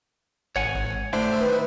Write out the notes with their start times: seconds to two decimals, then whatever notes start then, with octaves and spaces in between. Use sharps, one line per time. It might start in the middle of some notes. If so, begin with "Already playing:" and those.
0.56 G#1 C#5 F#5 G#5
1.13 A2 D3 A3 D4 C5 E5
1.40 D#3 B4